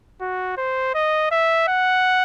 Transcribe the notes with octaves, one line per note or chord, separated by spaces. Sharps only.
F#4
C5
D#5
E5
F#5